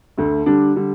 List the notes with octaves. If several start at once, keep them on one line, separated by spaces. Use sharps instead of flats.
D2 D3 A3
D3 G3 D4
D3 G3